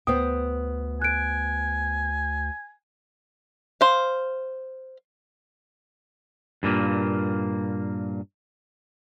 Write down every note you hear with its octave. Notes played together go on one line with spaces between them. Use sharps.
D2 B3 C5 G5 D#6
G#5 F#6 D7
C5 F5
G2 A#2 A#3